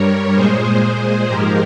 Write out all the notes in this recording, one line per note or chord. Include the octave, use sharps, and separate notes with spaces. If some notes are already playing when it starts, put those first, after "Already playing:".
Already playing: G2 G3 A#4 C#5
A#2 G#3 G#4 C5
G#2 F3 G#3 G4 A#4